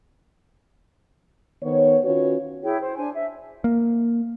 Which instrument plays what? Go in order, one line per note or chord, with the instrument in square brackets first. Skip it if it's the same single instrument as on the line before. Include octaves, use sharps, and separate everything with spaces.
[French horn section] D#3 B3 C5 C#5
D#3 C#4 F4 F#4 B4 C#5
[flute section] E4 G#4 C#5 G5
C5
D4 C5 G#5
E5
[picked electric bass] A#3